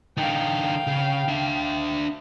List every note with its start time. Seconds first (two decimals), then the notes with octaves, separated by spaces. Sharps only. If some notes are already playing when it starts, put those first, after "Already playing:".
0.17 D3 D#4 F5 G5
0.87 C#3
1.28 D4 E5